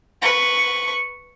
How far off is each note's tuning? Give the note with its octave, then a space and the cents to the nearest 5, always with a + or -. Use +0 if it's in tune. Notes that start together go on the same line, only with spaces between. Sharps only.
B4 +0 C#6 +0